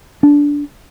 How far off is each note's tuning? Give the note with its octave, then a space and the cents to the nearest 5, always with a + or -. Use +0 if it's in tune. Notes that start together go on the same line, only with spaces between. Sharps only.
D4 -15